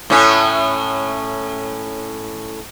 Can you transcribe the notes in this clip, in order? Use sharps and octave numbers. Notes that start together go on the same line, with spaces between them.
A2 C#4